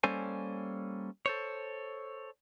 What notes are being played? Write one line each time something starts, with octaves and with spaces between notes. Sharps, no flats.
G3 A#3 C#4 A4 C5 G#5
A4 C5 C#5